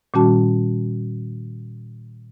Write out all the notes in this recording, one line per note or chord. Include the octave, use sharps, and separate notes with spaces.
A#2 D#3 G3 C#4 F#4 A5